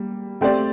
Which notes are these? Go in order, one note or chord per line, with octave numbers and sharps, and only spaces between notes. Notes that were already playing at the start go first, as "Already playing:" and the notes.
Already playing: G3 A#3
A3 C4 G4 D5